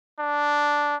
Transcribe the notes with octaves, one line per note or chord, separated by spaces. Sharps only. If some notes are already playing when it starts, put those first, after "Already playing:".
D4